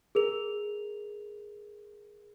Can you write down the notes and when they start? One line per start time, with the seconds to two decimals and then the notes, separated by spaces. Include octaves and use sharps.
0.15 G#4 A#4 F7